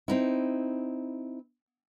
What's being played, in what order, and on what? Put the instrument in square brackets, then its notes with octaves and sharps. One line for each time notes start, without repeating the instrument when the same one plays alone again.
[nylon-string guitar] C4 D#4 E4